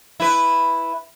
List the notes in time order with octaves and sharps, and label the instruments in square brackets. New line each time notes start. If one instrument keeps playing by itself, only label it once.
[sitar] E4 B4